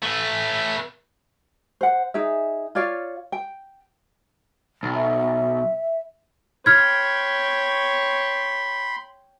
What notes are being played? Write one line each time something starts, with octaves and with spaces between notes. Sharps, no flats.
A3 B4
C5 F#5
D#4 G#4 E5
F4 C#5 D5 F5
G5
B1
E5
C#5 G5 B5 C6 F6 G#6